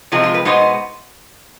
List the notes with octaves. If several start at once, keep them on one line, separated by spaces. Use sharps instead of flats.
C3 F3 G#3 C4 F4
F4
B4
B2 G#3 B3 D#4 C5